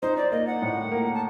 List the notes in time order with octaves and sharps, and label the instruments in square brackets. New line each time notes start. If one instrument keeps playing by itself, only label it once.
[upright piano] D#4 [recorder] C5
[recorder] D5
[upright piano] A#3 [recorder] D#5
[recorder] F#5
[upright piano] A2
A#3
[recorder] A5